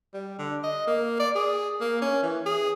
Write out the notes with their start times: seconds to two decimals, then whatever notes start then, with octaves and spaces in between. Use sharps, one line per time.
0.14 G3
0.39 D3
0.64 D#5
0.87 A#3
1.20 D5
1.35 G#4
1.81 A#3
2.02 C#4
2.23 E3
2.46 G#4